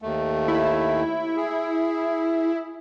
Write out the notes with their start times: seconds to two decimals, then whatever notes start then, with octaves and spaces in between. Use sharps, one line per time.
0.02 D#2 A3
0.48 E4
1.36 G#4